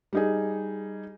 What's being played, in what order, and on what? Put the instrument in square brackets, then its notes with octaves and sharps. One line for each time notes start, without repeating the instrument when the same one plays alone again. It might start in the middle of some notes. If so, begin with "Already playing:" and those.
[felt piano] G3 D#4 G#4